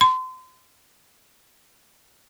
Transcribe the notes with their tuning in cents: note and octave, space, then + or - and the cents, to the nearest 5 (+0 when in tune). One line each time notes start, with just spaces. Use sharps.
C6 -35